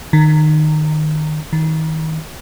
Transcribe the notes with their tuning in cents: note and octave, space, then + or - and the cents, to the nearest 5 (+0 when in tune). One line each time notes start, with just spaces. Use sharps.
D#3 -20
D#3 +30